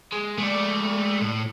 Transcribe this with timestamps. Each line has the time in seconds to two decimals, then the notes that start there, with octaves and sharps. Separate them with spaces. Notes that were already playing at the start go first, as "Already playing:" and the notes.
0.12 G#3
0.38 G#3 A3 D5
1.21 A2